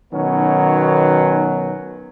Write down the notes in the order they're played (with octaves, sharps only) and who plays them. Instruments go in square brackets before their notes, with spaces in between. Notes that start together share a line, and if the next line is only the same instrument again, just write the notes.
[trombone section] B2 D#3 F#3 B3 C#4 D#4